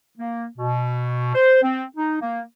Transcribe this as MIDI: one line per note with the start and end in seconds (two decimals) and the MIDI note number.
0.17 0.45 58
0.57 1.32 47
1.34 1.61 72
1.63 1.83 60
1.96 2.16 63
2.21 2.41 58